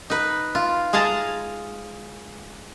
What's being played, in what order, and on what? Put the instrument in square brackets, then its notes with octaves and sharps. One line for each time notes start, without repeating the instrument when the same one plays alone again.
[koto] D#4 B4
F4
G#3 G#4 F5 A5 A#5